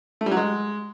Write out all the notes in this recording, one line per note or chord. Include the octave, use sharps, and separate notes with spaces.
A3
G3
F#3
G#3